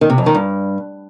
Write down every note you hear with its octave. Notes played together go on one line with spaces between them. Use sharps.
D#3
C3
F2
D#3
G2